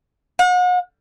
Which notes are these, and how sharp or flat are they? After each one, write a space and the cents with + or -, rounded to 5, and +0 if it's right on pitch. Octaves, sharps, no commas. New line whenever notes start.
F#5 -40